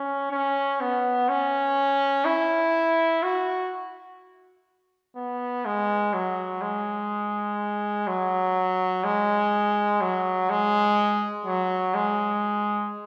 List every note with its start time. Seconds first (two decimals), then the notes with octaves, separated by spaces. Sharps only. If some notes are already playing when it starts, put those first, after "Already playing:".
Already playing: C#4
0.31 C#4
0.81 B3
1.29 C#4
2.25 E4
3.23 F#4
5.16 B3
5.65 G#3
6.14 F#3
6.62 G#3
8.07 F#3
9.04 G#3
10.01 F#3
10.50 G#3
11.46 F#3
11.94 G#3